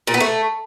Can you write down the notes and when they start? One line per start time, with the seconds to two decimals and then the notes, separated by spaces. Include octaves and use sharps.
0.07 A#2
0.14 B3
0.20 A3